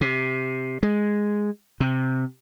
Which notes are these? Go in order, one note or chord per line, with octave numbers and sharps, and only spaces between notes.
C3
G#3
C3